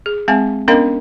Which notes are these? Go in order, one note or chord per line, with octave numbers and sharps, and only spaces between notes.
G#4
G#3 C4 G#4 E5 F5 G#5
B3 C#4 D4 A#4 D#5 F5